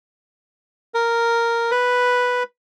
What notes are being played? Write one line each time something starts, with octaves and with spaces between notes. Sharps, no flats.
A#4
B4